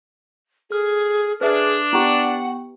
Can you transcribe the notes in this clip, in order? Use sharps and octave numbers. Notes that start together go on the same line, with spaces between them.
G#4 A4 F6
D4 G#4 B4 E5
B3 E4 G4 F#5 G5 C#6